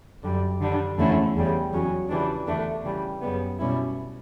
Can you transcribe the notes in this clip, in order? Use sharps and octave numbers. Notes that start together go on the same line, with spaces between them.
F#2 D3 G3
D3 G3 D4
E2 D3 A3 C#4 E4
E2 C#3 G3
E2 C#3 F#3 C#4
C#3 E3 G3 D4
E2 D3 A3 D4
C#3 E3 G3
F#2 C#3 G3 B3
B2 G3 C#4 E4